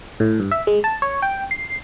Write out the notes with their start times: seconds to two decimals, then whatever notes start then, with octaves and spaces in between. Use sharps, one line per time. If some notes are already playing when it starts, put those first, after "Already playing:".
0.20 A2
0.40 G2
0.51 E5
0.67 G#3
0.84 A5
1.02 C#5
1.22 G5
1.51 C7